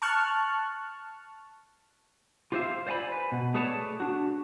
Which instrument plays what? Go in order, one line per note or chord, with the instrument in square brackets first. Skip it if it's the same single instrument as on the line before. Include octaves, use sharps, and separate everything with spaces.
[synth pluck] A5 C#6 F6 F#6
[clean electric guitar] F4 G4 C5 D5 E5 F5
C5 D5 F5 G#5 B5
B4
B2
A3 G#4 B4 C#5 D5 A5
D4 F#4